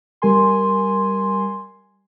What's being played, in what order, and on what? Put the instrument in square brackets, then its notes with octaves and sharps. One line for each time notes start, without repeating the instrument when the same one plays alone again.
[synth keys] G3 A#4 G#5 C6